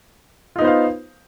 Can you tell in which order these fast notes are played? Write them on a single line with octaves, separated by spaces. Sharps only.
F4 D#4 B3 C5 F5